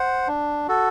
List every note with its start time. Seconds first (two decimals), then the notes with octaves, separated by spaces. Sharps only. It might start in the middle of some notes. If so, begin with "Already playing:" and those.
Already playing: C5 F#5
0.28 D4
0.68 F#4 A4